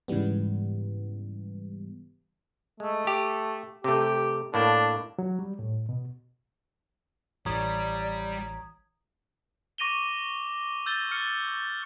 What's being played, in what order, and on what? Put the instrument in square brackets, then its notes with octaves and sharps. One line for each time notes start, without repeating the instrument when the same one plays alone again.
[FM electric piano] G#2 C#3 E3 G3 B3
[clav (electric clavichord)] G#3 [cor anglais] A3
[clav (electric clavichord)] G4
[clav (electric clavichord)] C3 A3 [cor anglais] G4
[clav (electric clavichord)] A2 A#3 [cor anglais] D4
[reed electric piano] F#3
G3
A2
B2
[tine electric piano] A1 E3 C#5 [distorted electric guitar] G3 [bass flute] D5 [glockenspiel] A#5 D#6 G#6
[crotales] C#6 D6 A#6 D#7 F7 G7
E6 G6 A6 G7
F6 C#7